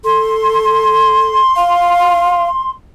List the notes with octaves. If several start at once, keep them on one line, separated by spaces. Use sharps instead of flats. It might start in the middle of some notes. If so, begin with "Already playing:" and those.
A4 C6
F5